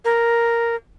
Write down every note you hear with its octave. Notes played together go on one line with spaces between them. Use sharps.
A#4